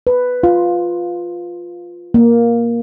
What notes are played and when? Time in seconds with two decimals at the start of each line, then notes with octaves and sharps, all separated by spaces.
0.07 B4
0.43 F4
2.14 A#3